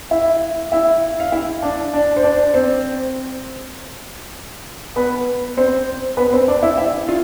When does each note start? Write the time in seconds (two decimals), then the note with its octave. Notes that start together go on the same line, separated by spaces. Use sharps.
0.11 E4 E5
0.72 E4 E5
1.20 F5
1.32 E4 E5
1.63 D4 D5
1.93 D4 D5
2.16 C5
2.23 D4 D5
2.54 C4 C5
4.96 B3 B4
5.57 C4 C5
6.17 B3 B4
6.33 C4 C5
6.48 D4 D5
6.62 E4 E5
6.78 E4 E5
7.08 F4 F5